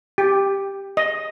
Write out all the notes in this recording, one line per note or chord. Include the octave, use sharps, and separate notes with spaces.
G4
D#5